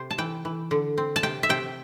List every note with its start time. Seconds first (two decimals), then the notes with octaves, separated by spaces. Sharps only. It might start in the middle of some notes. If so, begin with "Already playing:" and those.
Already playing: C3 C5
0.11 A5
0.18 E3 G5
0.45 E3
0.71 D3
0.98 C4
1.16 A5
1.23 C3 G5
1.43 E5
1.49 C3 G5